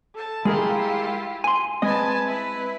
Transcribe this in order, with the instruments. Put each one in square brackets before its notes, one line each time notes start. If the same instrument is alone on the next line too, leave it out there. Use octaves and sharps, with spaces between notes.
[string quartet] A4 A5
[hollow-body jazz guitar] G#3 G#4 A#4 [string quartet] E4 F4 G4
[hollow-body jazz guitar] G#5 C6
[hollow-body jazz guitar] G#3 C4 D#5 [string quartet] B4 G#5 A5
[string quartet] E4 B4